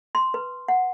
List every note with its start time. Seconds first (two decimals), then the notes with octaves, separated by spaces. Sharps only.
0.15 C6
0.34 B4
0.68 F#5